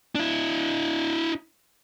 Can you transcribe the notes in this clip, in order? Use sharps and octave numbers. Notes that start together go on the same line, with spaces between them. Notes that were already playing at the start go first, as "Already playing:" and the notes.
D4 E4